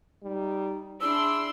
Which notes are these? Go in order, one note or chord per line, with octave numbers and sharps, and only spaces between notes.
G3 D#4
D4 E4 G#4 C6 E6